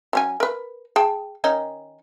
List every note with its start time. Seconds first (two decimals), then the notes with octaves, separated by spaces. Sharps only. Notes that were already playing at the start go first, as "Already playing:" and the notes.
0.13 F#3 C#4 G#5
0.40 A#4 B4
0.96 G#4 G5 A5
1.44 D#3 C#4 D#4